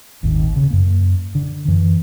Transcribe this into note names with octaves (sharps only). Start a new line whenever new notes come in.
D#1 G#1 D#2
C#3
F#2 A#3
D3
F#2 E3